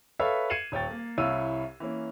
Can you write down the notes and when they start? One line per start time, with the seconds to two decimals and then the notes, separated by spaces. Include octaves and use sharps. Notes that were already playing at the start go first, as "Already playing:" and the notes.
0.19 A4 B4 C#5 E5 F5
0.50 G#6 C7 C#7 D#7 E7 F#7
0.72 D#1 C#5 G5 A6
0.90 A#3
1.18 C2 E4 C#5 F5 E6 D#7
1.80 E3 A#3 C#4